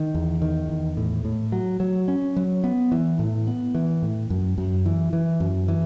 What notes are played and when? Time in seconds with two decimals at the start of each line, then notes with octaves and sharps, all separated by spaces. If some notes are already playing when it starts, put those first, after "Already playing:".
Already playing: D#3
0.15 E2
0.42 D#3
0.69 E2
0.97 A2
1.25 A2
1.52 F#3
1.80 F#3
2.08 C#4
2.36 F#3
2.64 B3
2.92 E3
3.19 A2
3.47 B3
3.75 E3
4.02 A2
4.30 F#2
4.58 F#2
4.86 E3
5.13 E3
5.40 F#2
5.68 E3